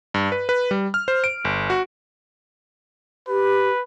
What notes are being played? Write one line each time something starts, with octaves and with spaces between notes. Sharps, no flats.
G2
B4
B4
G3
F6
C5
D7
G1
F#4
G4 B4